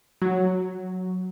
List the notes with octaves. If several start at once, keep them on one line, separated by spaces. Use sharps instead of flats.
F#3